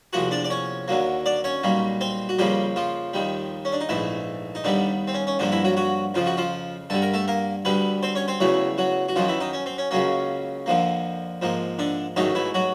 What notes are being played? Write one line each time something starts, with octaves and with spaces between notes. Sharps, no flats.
E2 C3 F3 A#3 F#4 F#5
D4 D5
D5
C#4 C#5
D#2 D3 F#3 A#3
D4 D5
C#4 C#5
B1 A#2 G3 A#3
C4 C5
F#4
F2 C#3 F3 G3 A#3 G4
F3 F4
D#2 D#3 G3
C#4
D4
D#4
A#1 G#2 E3 A3 E4
D#4
D#2 D3 D#3 G3 B3 D4
C4
C#4
C#4
G2 D3 F3 A#3 D4
E3 E4
F#3 F#4
F#3 F#4
F2 C#3 F3 F4
F#4
F3 F4
G2 D3 G3 A4
A#4
A3 A4
A#3 A#4
D2 D3 G3 B3 B4
C4 C5
C#4 C#5
C4 C5
E2 C#3 E3 F#3 A3 F#4
F#3 F#4
F#4
F#2 D#3 F3 F#3 F4
E3 E4
D#3 D#4
C#4
C4
C#4
C#2 C#3 F#3 A#3 C#4
F2 D3 F3 A#3
G#2 F3 A#3
D3 D4
A1 G#2 D#3 F#3 A3 D#4
E3 E4
F#3 F#4